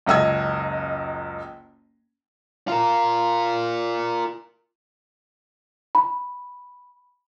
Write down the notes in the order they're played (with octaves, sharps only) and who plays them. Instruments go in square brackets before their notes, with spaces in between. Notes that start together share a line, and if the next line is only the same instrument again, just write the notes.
[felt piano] F#1 C#2 D#5 E6 G#6
[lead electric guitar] F4 A#4
[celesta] B5